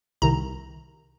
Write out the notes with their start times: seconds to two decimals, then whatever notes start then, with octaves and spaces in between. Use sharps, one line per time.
0.22 C2 C3 D#3 A#5